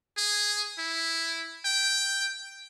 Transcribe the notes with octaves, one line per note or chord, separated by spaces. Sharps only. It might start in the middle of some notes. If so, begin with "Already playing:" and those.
G#4
E4
G5